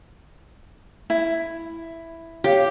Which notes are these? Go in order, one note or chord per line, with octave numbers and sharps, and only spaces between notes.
E4
G4 C#5 F5